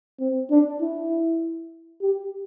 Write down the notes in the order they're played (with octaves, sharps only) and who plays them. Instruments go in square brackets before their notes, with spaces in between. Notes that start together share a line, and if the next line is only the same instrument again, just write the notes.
[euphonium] C4
D4
E4
G4